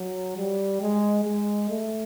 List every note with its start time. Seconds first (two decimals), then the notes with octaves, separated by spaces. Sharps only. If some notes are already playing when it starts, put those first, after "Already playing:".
Already playing: F#3
0.37 G3
0.81 G#3
1.24 G#3
1.69 A3